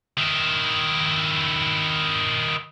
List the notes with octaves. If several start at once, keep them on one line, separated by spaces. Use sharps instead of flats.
D#3 E4